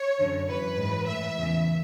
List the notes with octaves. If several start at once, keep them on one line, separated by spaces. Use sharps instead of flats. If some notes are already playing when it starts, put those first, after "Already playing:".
Already playing: C#5
F#2 D3
F#2 E3 B4
G#2 E3
A2 E3 E5
E2 C#3 E3